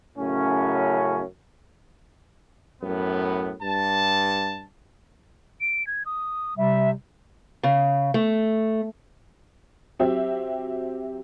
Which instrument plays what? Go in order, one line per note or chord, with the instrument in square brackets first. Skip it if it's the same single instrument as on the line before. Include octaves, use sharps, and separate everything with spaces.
[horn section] F#2 A2 C#3 C#4
[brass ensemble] F#2 A2 B3
G2 A5
[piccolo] D7
G#6
D#6
[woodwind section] C3 G3 [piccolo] E5
[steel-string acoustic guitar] C#3
A3
[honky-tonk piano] F#3 C4 G4 E5